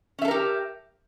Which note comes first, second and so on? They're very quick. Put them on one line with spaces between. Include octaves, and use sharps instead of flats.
C#4 E5 A4 A#4 G4